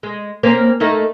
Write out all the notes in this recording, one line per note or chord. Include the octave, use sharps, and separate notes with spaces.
G#3
A#3 C4 C#4
A3 A#3 D#4